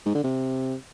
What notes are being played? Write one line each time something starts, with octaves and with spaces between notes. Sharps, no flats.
G#2
D3
C3